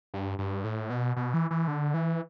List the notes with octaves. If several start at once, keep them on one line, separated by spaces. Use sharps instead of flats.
G2
G2
A2
B2
B2
E3
E3
D3
E3